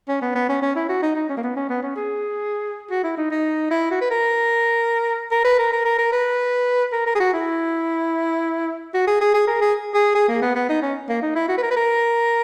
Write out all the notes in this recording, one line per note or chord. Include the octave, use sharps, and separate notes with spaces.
C#4
B3
B3
C#4
C#4
E4
F#4
D#4
D#4
C#4
A#3
B3
C#4
B3
C#4
G#4
F#4
E4
D#4
D#4
E4
F#4
B4
A#4
A#4
B4
A#4
A#4
A#4
A#4
B4
A#4
A#4
G#4
F#4
E4
F#4
G#4
G#4
G#4
A#4
G#4
G#4
G#4
A#3
B3
B3
D#4
C#4
A#3
D#4
E4
F#4
B4
A#4
B4
A#4